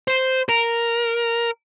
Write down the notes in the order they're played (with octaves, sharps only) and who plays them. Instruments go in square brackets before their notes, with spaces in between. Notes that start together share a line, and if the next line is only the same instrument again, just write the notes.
[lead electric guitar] C5
A#4